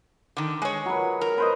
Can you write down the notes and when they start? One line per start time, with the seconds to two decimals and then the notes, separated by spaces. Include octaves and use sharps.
0.37 D3 D#3
0.62 G#3 C#5
0.86 F#3 B4
1.21 A#4
1.38 B4 C5 D#5